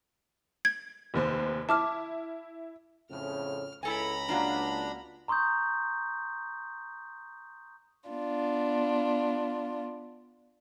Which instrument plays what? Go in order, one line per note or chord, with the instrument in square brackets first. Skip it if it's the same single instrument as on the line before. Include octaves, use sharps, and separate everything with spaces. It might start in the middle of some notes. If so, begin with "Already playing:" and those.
[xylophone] G#6
[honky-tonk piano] F1 D#2 C5
[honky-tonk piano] E4 [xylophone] A5 D6 F6
[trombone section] F2 A2 C#3 [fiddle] F6
[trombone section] C#2 [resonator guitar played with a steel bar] E4 A4 G#5 [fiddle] A#5 B5
[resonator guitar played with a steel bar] A#3 F4 F#4 [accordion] D4
[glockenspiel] A#5 C6 C#6 D#6 G6
[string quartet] B3 D4 F4